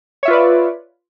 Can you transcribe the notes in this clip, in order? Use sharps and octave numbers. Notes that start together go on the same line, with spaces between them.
F4 B4 C#5 D5 E5